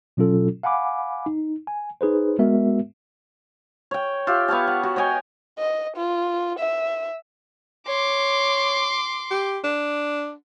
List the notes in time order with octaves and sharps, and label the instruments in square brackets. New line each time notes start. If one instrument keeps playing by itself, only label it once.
[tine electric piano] B2 F#3 C#4 F4 A4
F5 F#5 G#5 B5 D6
D#4
G#5
D#4 G#4 B4 C5
G#3 B3 F#4 A#4 E5
[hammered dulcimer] C#5 G5
F4 G4 E5 G5
B3 C#5 F5 A5
F#5
F#4
C#5 D#5 G5 G#5
[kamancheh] D#5
F4
E5
[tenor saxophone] C#5 [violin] C6 D6
[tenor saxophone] G4
D4